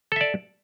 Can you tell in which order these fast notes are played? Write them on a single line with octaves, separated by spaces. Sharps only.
A4 E5 D5